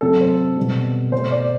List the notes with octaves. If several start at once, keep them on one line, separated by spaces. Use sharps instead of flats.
C3 F#3 A3 A4
C5
B2 G3
B2 A3 C5
D5